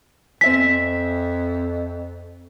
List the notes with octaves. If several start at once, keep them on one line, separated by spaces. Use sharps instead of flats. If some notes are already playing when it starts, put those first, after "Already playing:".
F2 C4 E5 G#5 B6